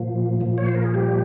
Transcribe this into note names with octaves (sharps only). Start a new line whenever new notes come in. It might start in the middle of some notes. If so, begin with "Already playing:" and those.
Already playing: A#2 F3
A#2 F3
C#5
C5
A#4
G#4
G3 G4